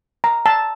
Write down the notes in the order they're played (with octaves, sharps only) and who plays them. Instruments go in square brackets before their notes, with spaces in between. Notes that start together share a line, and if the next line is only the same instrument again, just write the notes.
[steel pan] A#5
A5